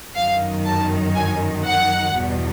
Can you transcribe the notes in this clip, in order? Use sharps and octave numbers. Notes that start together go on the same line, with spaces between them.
G1 F#2 D#3 F#3 F5
A5
G#5
F#5
E2 B2 G3